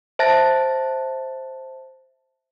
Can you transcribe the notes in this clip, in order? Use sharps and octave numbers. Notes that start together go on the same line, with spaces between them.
C5 E5 A5 F#6 A6 A#6